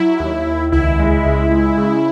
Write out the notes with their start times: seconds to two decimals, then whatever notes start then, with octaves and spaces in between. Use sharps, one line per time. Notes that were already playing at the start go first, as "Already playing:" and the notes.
Already playing: F#3 E4
0.20 D#2
0.46 D#2
0.72 C#2 E4
0.99 G#3
1.25 C#2
1.51 G#3
1.77 C#3